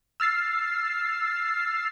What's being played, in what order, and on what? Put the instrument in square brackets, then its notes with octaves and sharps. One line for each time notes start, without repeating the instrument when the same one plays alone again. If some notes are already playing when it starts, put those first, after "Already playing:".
[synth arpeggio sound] E6 F6 A6 C7